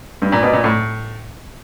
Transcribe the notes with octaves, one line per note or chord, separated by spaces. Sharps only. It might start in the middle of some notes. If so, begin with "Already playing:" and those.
G2
A#2
B2
A#2
A2